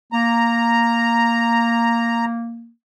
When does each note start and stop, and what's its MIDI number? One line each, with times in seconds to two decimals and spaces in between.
0.12 2.70 58
0.12 2.25 82